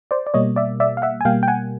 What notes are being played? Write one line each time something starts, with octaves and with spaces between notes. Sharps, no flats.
C5 D5
D5
B2 G3 A#3 C#5 D#5
D5 E5
D5 E5
F5
E5 F#5
G#5
B2 G3 A#3 F5 G5
G5
F#5 G#5